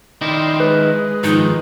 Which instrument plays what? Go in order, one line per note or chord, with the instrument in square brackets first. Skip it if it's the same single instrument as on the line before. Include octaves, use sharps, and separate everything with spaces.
[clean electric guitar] D#3 D#4 E4 [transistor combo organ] D5 G5 C6
[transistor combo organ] G#3 [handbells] B4
[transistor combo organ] G#2 F3 G#3 [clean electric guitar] D#3 [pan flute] D#4